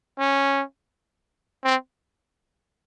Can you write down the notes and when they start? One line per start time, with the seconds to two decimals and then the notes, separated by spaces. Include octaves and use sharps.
0.19 C#4
1.64 C4